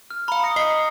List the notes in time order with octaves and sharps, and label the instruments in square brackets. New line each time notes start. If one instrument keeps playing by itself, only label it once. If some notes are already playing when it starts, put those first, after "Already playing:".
[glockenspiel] F6
[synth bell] F5 B5 [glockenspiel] A#5
[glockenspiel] D#6 A#6 C#7
[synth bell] D#5 A#5 C7